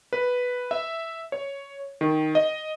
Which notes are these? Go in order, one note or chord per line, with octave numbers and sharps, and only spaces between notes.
B4
E5
C#5
D#3
D#5